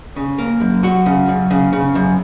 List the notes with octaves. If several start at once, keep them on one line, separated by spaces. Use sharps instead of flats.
C#3
A#3
F#2
F#3 F#4
C#3
F#2
C#3
C#3
F#2